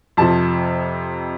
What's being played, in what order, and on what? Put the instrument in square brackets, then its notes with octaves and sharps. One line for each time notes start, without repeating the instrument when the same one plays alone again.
[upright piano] F2 C3 F3 A5